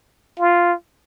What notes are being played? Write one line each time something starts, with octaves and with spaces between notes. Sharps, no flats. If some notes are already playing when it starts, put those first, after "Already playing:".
F4